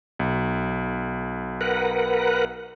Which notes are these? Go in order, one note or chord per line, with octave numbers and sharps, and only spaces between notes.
B1
A#4 B4 F#5